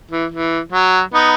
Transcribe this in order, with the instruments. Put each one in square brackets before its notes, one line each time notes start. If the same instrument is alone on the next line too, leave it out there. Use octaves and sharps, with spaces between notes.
[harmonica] E3
E3
F#3
B3 D#4